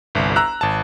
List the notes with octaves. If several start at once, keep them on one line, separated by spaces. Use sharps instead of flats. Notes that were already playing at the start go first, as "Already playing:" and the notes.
G1 C2
A#5 E6 F#6
G#1 A5